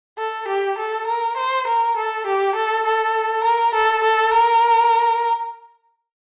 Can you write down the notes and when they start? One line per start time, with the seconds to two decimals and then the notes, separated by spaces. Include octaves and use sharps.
0.18 A4
0.48 G4
0.78 A4
1.07 A#4
1.37 C5
1.67 A#4
1.97 A4
2.26 G4
2.55 A4
2.86 A4
3.44 A#4
3.75 A4
4.04 A4
4.33 A#4